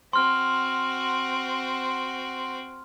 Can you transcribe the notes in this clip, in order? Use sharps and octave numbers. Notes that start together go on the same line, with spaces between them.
C4 F#4 C6 F6